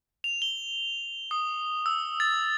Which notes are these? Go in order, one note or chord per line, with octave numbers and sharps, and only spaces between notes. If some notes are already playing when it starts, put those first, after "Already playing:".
F7
G7
D#6
E6
A6